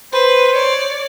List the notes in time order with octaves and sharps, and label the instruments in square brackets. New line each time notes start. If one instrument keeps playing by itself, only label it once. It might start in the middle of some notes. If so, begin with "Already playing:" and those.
[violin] B4 [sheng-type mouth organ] C5
[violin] C#5 D5